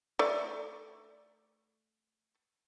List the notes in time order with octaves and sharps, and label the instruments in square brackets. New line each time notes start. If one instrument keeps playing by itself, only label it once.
[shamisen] A3 D5